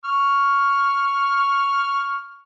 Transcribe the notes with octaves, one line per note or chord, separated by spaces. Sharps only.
C#6 F6